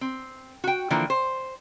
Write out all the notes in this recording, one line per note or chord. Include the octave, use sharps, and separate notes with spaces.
C4
F#4 G5
D3 E3 F3 A#3
C5